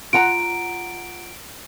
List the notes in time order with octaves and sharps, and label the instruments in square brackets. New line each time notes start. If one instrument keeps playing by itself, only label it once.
[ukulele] F4 F#5 A#5 [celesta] D7